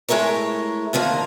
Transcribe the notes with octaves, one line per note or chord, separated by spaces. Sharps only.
G#3 A3 E4 A#4 C#5
D#2 D3 F3 A#3